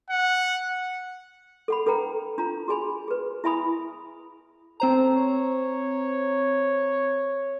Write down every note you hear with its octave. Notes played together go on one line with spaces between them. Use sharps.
F#5
A4 F#5 B5
D4 A4 B4 F#5 G5 A#5
D4 F4 A#5
F#4 G#4 G#5 B5
G#4 B4
E4 E5 G#5 B5 D#6
C4 A4 C5 A#5
C#5